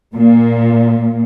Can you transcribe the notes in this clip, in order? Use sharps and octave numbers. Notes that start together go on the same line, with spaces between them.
A#2